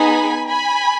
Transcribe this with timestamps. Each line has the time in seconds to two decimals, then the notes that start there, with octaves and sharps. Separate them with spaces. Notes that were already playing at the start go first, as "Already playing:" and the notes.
Already playing: B3 D#4 G#4 G#5 B5
0.47 G#5 B5